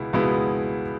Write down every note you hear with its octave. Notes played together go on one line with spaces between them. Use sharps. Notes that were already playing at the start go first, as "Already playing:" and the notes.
Already playing: C#2 B2 G#3 B3 E4
C#2 B2 G#3 B3 E4